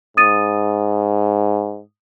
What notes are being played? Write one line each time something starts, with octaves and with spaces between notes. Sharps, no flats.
G#2 D#6 A6 D#7